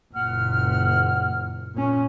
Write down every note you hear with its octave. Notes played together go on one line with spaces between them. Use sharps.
F#1 A#2 F#5 F6
A#2 C#4